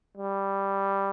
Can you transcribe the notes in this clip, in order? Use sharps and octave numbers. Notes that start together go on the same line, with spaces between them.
G3